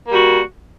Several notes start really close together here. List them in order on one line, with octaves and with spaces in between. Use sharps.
A#3 G3 F#4